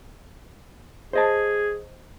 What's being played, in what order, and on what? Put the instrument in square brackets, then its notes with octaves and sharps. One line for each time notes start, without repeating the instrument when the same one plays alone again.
[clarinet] G#4 [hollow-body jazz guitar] C5 D#5 A5